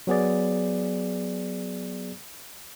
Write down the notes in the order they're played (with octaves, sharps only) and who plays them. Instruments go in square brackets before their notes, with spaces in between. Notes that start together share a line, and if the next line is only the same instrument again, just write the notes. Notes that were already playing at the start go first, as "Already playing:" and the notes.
[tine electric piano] F#3 B3 G#4 D5